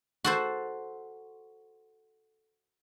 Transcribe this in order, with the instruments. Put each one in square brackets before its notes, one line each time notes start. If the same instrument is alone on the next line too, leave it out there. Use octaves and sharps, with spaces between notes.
[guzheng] F#4 A4 C5